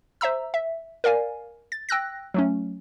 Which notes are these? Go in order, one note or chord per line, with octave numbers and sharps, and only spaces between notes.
C5 E5 A#5 E6
E5
A#4 D5 F5 G#5
A6
G5 E6 F#6 A#6
F#3 A3 C#4